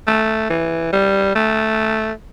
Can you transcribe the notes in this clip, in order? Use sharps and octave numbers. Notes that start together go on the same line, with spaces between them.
A3
E3
G3
A3